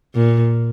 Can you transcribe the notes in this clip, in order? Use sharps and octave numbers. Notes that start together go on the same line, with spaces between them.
A#2